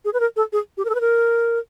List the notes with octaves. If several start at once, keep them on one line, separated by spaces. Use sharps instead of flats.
G#4
B4
A#4
A4
G#4
G4
A#4
A4
B4
A#4